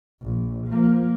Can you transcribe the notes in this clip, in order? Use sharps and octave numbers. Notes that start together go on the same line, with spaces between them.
A#1
F3 A#3